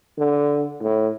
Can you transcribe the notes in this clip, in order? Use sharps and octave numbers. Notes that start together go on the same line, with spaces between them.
D3
A2